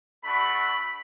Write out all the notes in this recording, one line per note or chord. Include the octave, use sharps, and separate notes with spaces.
A3 D4 F#4 B5